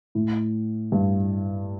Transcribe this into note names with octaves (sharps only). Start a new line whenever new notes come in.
A2
G2